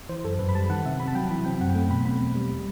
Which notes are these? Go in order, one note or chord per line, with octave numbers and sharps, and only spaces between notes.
E3 C5
F#2 A4
F#2 B4
B5
G3 A5
D#3 F#5
C3 E5
C3 B5
A5
F#3 G5
E3 B5
C4 G5
G5
F#2 F#5
A3 G5
B2 B5
C4 B5
E2
G3
G3